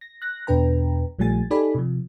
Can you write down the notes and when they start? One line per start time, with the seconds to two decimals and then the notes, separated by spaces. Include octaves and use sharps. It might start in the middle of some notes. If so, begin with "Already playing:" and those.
0.01 A#6
0.22 F#6 A#6
0.47 E2 B2 D4 B4 G5 A#5
1.19 A#1 F3 G3 A3 G#5 A6
1.51 D#4 G4 A4 D5 G#5 B5
1.75 C3 F3